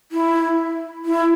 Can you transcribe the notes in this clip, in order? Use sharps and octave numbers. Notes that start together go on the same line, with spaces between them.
E4
E4